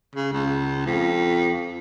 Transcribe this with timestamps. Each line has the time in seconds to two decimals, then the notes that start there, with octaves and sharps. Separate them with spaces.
0.15 C#3
0.32 C#2
0.86 F2